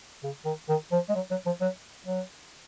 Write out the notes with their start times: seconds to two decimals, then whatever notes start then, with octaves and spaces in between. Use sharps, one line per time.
0.23 C#3
0.45 D#3
0.69 D#3
0.92 F3
1.09 G#3
1.15 F#3
1.31 F#3
1.46 F3
1.61 F#3
2.06 F#3